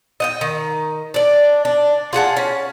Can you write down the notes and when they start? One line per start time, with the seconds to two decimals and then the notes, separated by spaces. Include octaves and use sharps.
0.20 D#5 F#5 G5
0.41 D#3
1.14 D4 D5
1.65 D4
2.13 F4 G#4 F#5 A5
2.37 C#4